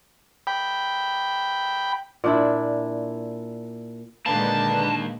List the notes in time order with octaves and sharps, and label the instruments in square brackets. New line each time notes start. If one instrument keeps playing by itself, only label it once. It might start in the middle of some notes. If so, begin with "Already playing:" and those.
[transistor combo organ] G5 B5
[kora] A#2 D4 E4
[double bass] A#2 G#3 [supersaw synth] D3 D4 B4 [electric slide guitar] D#3 A#3 [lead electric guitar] A5